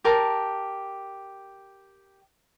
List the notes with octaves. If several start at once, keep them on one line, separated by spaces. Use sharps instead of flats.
G4 A#4 A5